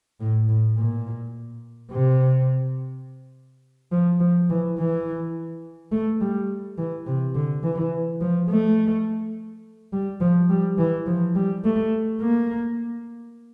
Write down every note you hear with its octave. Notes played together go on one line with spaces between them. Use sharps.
A2
A2
A#2
C3
F3
F3
E3
E3
A3
G3
E3
C3
D3
E3
F3
A3
G3
F3
G3
E3
F3
G3
A3
A#3